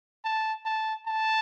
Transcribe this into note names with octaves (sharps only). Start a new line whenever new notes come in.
A5
A5
A5